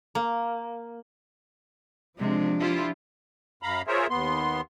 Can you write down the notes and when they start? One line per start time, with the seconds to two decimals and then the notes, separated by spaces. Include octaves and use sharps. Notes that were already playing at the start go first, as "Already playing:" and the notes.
0.15 A#3
2.19 C3 F3 G#3 D4
2.60 E4 F4 G4
3.63 F#2 F5 A#5 B5
3.87 F4 G#4 A#4 C5 C#5 E5
4.10 D#2 B3 C6